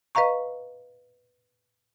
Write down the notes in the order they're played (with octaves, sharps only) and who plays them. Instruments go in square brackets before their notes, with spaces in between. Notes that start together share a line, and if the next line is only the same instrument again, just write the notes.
[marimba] B4 D#5 F5 A#5 C#6